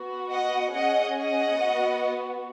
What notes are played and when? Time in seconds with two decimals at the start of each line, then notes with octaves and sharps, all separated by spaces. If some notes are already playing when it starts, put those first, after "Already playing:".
Already playing: B3 F#4
0.31 D#5 F#5
0.73 C#4 G#4 D#5 F#5
1.16 D#5 F#5
1.58 B3 F#4